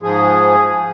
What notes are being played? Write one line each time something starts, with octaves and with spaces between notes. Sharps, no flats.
G#2 F3 G#4
F3